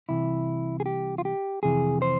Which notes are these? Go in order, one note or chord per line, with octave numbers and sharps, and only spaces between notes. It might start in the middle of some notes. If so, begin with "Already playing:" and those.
C2 C3 E3 E4
G#4
G4
F4
G4
F2 C3 E3 G#4
C5